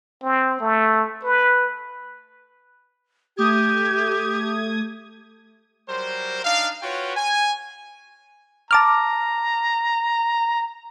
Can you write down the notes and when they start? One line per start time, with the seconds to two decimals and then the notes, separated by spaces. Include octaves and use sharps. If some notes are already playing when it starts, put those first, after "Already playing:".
0.23 C4
0.61 A3
1.24 B4
3.37 A3 G4 D#6 G#6
5.87 F#3 G3 A#4 C5
6.44 D4 D#4 F5
6.82 F4 F#4 B4 C#5 G5
7.15 G#5
8.71 A5 A#5 D6 F6